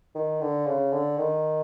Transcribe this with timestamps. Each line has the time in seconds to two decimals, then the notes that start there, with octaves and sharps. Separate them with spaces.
0.15 D#3
0.41 D3
0.66 C#3
0.92 D3
1.18 D#3